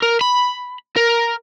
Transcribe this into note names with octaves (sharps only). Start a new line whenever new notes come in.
A#4
B5
A#4